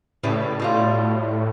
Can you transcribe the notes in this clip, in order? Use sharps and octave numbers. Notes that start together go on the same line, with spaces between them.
A2 C#3 G3 B4
B2 G3 F4